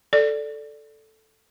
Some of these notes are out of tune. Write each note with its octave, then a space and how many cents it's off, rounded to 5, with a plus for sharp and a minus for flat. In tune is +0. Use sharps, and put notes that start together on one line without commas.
A4 +0 D5 +0